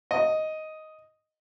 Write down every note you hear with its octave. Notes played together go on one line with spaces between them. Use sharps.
D#5